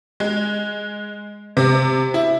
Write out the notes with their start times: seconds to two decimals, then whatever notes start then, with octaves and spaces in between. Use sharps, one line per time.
0.20 G#3
1.57 C3
2.14 E4